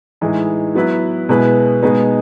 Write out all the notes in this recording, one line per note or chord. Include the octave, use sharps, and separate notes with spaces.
A2 E3 G#3 D#4
F#3 B3 E4 B4
B2 G#3 B3 E4 B4
B2 G#3 B3 D#4